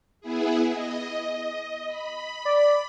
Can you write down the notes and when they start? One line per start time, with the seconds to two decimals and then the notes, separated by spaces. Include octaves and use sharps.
0.21 B3 E4 G#4
0.72 D#5
1.88 B5
2.45 D5